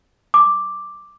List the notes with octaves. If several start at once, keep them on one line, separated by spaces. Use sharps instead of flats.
D6